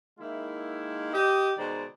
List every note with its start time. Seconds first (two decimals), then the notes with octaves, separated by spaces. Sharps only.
0.19 D#3 G#3 A#3 E4
1.13 G4 D#5
1.57 B2 D#3 G#3 C5 D5 A#5